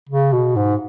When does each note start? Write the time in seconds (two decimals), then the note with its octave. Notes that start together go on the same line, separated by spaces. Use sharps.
0.09 C#3
0.33 B2
0.56 G#2